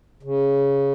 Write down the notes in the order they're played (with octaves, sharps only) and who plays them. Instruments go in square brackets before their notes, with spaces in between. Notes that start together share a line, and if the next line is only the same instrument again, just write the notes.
[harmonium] C#3